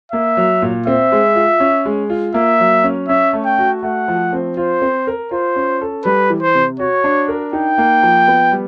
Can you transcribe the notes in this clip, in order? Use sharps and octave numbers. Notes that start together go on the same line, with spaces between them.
A#3 E5
F#3
A#2
C4 E5
G#3
F4
C#4
G#3
F4
A#3 E5
F#3
C#4
C#4 E5
A3
G5
F#4
A3 F#5
F3
C4
F4 C5
C4
A#4
F4 C5
C#4
A4
G3 B4
E3
C5
C3
F#4 C#5
D4
A#4
D#4 G5
A#3
F3
B3
G3